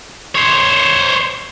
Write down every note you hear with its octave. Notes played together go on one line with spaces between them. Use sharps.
C5 C#5